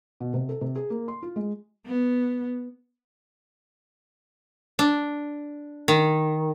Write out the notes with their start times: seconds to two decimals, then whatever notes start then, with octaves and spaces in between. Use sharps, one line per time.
0.20 B2
0.34 C3
0.49 A4
0.61 C3
0.76 G#4
0.90 A#3
1.08 C6
1.22 F4
1.36 G#3
1.86 B3
4.79 D4
5.88 D#3